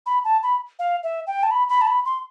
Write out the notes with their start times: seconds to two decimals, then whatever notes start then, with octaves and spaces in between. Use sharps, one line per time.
0.06 B5
0.25 A5
0.43 B5
0.79 F5
1.03 E5
1.27 G5
1.43 A5
1.51 B5
1.69 B5
1.81 A5
1.87 B5
2.05 C6